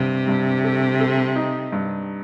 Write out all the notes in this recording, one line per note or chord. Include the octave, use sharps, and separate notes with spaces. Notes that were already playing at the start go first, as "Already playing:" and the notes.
Already playing: G2 C3
G2
A4
A4
D#4
G2